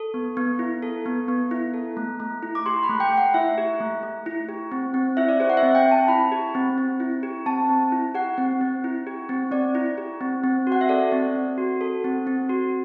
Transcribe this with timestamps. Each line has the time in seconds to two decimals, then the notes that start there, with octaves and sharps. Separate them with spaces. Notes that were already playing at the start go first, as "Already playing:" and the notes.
Already playing: A4
0.14 B3
0.37 B3
0.59 E4
0.82 A4
1.06 B3
1.28 B3
1.51 E4
1.74 A4
1.97 A3
2.20 A3
2.43 E4
2.55 D6
2.66 G4 C6
2.83 B5
2.89 A3
3.00 G5
3.12 A3
3.17 F#5
3.34 E4 E5
3.58 G4
3.80 A3
4.03 A3
4.26 E4
4.49 G4
4.72 C4
4.94 C4
5.17 E4 E5
5.28 D5
5.40 G4 C5
5.50 F#5
5.57 E5
5.63 C4
5.75 G5
5.86 C4
5.91 A5
6.08 E4 B5
6.32 G4
6.55 C4
6.78 C4
7.00 E4
7.23 G4
7.46 C4 A5
7.69 C4
7.92 E4
8.15 G4 F#5
8.38 C4
8.61 C4
8.84 E4
9.07 G4
9.29 C4
9.51 C4 D5
9.75 E4
9.98 G4
10.21 C4
10.44 C4
10.67 F#4
10.72 F#5
10.81 E5
10.89 A4 D5
11.12 C4
11.36 C4
11.58 F#4
11.81 A4
12.04 C4
12.27 C4
12.50 F#4